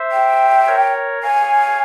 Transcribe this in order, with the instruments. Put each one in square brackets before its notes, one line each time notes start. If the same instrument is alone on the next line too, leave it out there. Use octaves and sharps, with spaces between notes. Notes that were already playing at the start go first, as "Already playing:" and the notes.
Already playing: [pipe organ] C5 E5
[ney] G5
[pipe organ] A#4 C#5
[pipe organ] C#5 F5 [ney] G#5